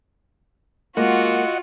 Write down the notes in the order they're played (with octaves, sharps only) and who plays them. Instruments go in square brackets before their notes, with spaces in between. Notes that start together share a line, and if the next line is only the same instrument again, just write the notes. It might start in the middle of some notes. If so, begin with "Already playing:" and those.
[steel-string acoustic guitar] G#3 A#3 [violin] F4 [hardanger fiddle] F#4 [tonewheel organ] D#5 F#5